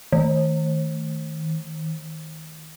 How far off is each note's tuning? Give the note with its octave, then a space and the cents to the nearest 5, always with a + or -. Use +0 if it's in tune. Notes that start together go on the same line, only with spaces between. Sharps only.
D#3 +25